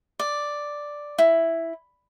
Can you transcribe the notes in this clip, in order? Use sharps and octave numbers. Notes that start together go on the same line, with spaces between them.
D5
E4